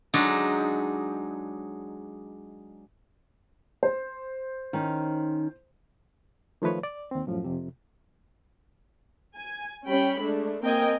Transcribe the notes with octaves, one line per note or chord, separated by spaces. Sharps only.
F#3 G#3 D4 D#4
C5
D#3 C#4 D#4
D#3 F3 A3 B4 C#5
D5
D#2 C4
F#2 A2 F3
F2 C3
G#5
G3 C#4 G5 B5
G#3 A3 D4
A#3 C4 A#4 D#5 G5 G#5